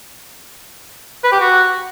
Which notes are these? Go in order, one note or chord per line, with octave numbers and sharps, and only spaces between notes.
B4
G4
F#4